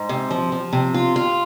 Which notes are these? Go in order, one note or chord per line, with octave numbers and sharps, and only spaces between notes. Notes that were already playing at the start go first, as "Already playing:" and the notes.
Already playing: G#2
C3
F3
F3
C3
F4
F4